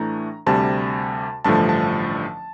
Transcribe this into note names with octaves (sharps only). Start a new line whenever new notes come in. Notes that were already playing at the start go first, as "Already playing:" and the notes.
Already playing: A2 E3 A3 D4 A#5
D2 C3 G3 A5
A1 G2 D3 F3 A3 A5
A5